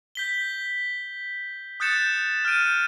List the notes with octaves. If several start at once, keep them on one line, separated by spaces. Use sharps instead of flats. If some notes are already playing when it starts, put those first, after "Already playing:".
G6 B6 G7
D#6 F#6 G6 A6 C#7 E7
F6 G6 D7 D#7